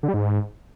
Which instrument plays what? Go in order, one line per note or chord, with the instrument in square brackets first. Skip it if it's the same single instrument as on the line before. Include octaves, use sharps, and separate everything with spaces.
[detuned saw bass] D3
G3
G#2